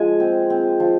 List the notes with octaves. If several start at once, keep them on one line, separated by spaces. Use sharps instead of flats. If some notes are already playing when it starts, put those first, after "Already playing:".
Already playing: F3 G#3 F4 G#5
C4
C4
F3